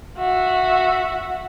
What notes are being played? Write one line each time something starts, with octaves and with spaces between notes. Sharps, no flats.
F#4 E5